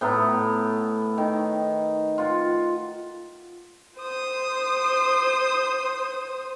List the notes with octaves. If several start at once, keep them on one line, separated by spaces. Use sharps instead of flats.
A2 B3 F#5 A#5
D#3
F4 F#5
C5 D#6